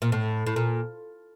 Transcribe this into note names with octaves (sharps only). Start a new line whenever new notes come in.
A#2
A2
A2
A#2